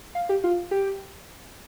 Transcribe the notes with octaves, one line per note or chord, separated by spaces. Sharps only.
F5
G4
F4
G4